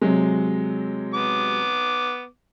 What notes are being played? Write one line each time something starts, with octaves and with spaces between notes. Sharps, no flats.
C3 F#3 G#3
B3 D6